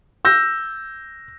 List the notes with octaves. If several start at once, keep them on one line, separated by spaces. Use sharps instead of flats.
E6 G6 A#6